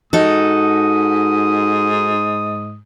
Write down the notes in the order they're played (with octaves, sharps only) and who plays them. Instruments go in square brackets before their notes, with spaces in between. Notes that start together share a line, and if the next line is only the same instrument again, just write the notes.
[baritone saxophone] G#2 [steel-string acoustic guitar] D#4 F#4 A4 [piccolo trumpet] D#6